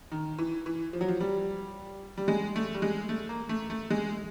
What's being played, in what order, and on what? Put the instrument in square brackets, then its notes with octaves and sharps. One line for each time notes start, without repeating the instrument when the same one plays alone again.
[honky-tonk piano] D#3
E3
E3
F3
F#3
F3
G3
G3
G#3
A3
G3
G#3
A3
A#3
A3
A3
G#3